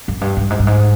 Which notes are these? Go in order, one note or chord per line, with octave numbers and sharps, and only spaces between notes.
F#2
G2
G2
G#2
G2
G#2